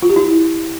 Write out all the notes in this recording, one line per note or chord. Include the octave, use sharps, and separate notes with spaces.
F4
G4
E4